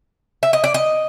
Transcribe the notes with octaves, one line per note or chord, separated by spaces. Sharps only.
E5
D#5
D5
D#5